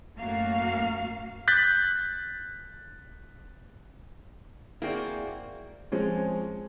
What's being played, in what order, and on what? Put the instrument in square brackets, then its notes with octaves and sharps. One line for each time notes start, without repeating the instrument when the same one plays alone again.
[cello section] F#2 A2 A3 A#3 F#4 F5
[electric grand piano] F#6 G6 A6 B6
[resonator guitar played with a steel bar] A#3 C4 F#4 [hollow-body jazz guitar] E4 G#4 D5
[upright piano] F3 G#3 C4 C#4 C#5